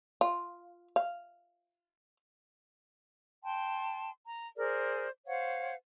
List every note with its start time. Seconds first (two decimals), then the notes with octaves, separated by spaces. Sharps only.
0.21 F4
0.96 F5
3.43 G5 A5 C6
4.25 A#5
4.57 G#4 A#4 C5 D5
5.25 C5 C#5 F5 F#5